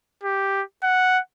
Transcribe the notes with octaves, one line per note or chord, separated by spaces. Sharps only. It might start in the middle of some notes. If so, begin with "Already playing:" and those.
G4
F#5